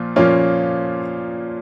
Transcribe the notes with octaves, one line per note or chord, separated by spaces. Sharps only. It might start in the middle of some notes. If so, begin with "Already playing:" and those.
Already playing: A#2 F3 F4
A#2 F3 A#3 C#4 F4